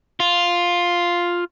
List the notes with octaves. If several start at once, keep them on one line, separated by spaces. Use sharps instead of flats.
F4